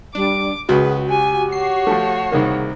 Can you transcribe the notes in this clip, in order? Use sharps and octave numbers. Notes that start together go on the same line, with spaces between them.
G3 D4 D6
C#2 F#4 G#4 B4
G4 G#5
F#4 C#5 C7
F3 A3
C2 D#3 A#3 G#4